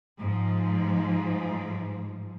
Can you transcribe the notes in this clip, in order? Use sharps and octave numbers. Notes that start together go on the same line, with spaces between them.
G#2 F3